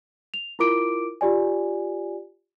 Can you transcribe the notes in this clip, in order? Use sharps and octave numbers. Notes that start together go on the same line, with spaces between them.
F7
E4 F4 A#4 D6 D7
F4 G4 D5 G#5